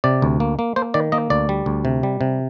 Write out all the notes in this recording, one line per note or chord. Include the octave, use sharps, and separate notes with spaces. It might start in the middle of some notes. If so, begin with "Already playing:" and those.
C3 D5
D2
A#3
A#3
A#3 C5
D#3 D5
A#3 D#5
D2 D5
G3
D2
C3
G3
C3